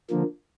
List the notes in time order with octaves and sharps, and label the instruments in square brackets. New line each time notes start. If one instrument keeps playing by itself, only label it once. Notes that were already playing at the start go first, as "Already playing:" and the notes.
[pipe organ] D3 F3 A#3